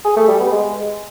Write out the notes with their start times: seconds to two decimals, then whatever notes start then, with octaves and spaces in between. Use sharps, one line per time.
0.05 G#4
0.16 A3
0.28 G3
0.40 B3
0.52 G#3